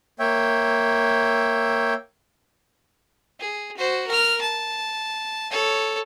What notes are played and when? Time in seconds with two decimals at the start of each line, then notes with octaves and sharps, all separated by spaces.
0.20 A#3 C#5 E5 G5
3.40 G#4
3.77 F#4 C5
4.07 A#4 F6
4.41 A5
5.51 A4 C#5